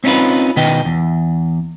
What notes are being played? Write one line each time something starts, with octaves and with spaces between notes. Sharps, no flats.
C4 C#4 D#4 F4 B4
B2 D#3 B4 D#5 G5
E2